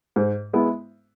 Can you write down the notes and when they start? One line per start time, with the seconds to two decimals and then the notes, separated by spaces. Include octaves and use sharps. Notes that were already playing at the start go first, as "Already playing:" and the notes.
0.16 G#2
0.53 G#3 B3 E4